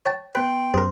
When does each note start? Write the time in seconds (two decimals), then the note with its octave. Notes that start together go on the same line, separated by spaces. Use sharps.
0.06 C#5 G5 A5
0.35 B3 B4 G5 C6
0.74 F#2 G#4 A#4 C5